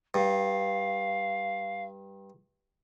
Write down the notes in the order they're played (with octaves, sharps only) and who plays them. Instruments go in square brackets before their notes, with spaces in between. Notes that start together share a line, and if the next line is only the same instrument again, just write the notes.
[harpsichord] G2 [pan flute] F5